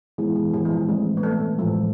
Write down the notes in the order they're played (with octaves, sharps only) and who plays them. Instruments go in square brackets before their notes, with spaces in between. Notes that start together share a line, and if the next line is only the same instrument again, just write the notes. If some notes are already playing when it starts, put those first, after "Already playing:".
[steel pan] E3 [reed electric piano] G#3 B3 E4 G#4
[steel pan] E3
E3
G#3
F3
[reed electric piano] E3 A3 C4 [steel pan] G#3
[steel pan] B3
A3
[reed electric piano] A2 E3 G#3 [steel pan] F3